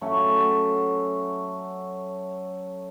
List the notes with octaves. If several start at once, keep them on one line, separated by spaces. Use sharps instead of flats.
F#3 A3 C#4 F#4